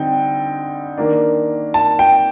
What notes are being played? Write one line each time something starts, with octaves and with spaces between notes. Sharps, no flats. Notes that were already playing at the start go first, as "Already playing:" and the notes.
Already playing: D3 G3 C4 D#4 G5
D#3 A#3 D4
A5
G5